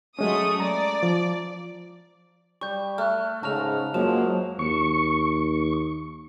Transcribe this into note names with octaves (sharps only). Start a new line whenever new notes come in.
F#3 G#3 A3 C#4 D#6
D5 A#5
F3
G3 C#6 G6
A3 F6 F#6
G#2 C#3 A5 A#5 F6 F7
F#2 F3 F#3 G#3 A#3 E7
D#2 C#6